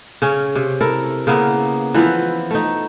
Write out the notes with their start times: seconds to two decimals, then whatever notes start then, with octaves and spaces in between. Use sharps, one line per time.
0.22 C#3 C#4
0.56 C3
0.81 E4 A4 A#4
1.27 C#3 A#3 B3 E4
1.94 E3 F3 B3 E4
2.51 A3 D#4